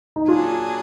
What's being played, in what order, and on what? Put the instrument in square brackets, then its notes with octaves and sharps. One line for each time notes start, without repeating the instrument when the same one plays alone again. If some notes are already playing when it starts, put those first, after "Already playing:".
[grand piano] D#4
[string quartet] A#2 F#3 D4 G#4 [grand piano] F4